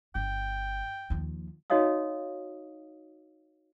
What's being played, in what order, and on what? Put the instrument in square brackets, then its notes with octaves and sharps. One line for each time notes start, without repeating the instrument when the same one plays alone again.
[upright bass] G1 [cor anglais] G5
[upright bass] D#2 F3
[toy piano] D#4 F#4 C#5 D#5 F5 D#6